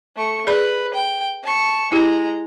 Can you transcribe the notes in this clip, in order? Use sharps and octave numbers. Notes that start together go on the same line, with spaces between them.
A3 C#6
G#4 B4 D5 B5
G5
A5 C#6
G#3 E4 G4 A#5